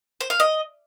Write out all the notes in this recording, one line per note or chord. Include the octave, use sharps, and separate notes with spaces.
C5
F5
D#5